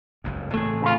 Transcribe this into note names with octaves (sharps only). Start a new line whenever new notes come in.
F#1 C#2 G2
A2 E3 A3 C4 G#4
C#3 F4